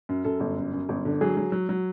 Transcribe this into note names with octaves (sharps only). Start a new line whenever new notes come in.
F#2
F#2 A4
G1
F#2
F#2
G1
D3
F#3 G#4
F#3
F#3
F#3